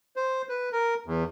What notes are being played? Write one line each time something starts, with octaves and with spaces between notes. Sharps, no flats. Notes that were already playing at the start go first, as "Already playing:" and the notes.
C5
B4
A#4
E2